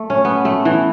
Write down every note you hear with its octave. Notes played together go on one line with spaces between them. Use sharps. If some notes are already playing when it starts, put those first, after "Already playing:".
Already playing: A3
C#4
B3
A3
E3